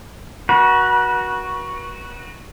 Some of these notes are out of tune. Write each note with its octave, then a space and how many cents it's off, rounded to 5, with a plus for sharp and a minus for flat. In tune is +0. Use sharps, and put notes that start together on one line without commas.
F#4 +0 B4 -45